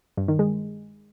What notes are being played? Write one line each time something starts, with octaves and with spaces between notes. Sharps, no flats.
G2
D#3
G#3